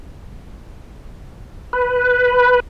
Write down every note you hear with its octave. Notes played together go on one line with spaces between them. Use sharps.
B4